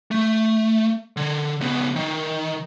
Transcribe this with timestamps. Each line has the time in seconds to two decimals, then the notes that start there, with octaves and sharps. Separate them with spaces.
0.11 A3
1.17 D3
1.61 C#2 B3
1.96 D#3